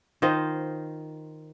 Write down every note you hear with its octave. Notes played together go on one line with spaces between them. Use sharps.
D#3 F4 C5 D#5